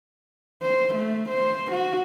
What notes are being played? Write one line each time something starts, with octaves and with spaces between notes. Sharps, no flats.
C5
A3
C5
F#4